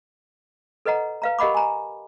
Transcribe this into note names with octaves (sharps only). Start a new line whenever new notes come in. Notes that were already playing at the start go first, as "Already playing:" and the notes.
A4 B4 D#5 F#5 A#5
B4 F5 A#5
G4 A#4 D#5 F#5 B5 D6
G#5 A#5